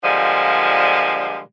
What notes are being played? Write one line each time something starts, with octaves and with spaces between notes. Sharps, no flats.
A#2 D3 F3 G3 G#3